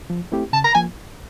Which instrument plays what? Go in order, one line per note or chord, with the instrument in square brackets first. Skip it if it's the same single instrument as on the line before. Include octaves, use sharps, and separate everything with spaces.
[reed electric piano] F3
A3 C4 E4 G4
[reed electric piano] C#3 [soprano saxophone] A5
[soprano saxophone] A#5
[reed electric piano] F3 A#3 [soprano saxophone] G#5